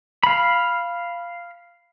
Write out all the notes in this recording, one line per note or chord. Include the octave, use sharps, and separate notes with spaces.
F5 B5